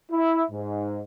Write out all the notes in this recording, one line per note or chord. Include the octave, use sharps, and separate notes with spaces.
E4
G#2